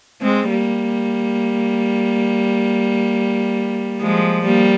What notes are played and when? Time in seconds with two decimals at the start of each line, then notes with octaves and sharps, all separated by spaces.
0.22 G#3 C4
0.50 G3 A#3
4.01 F3 G#3
4.45 G3 A#3